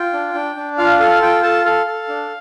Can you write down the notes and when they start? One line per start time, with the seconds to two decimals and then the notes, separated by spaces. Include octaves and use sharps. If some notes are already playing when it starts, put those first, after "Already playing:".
Already playing: F4 G5
0.13 D4
0.34 D4
0.56 D4
0.78 F4 F5
0.99 A4 F5
1.22 F4 G5
1.43 A4 A5
1.65 A4 F5
1.87 A4
2.08 D4